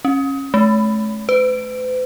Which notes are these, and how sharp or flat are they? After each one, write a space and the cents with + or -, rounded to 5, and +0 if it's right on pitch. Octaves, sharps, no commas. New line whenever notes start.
C#4 -20
A3 -35
B4 +45